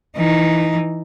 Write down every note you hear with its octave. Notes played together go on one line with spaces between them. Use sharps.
E3 D#4